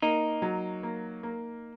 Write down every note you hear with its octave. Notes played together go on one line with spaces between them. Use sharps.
A#3 D#4
F#3
A#3
A#3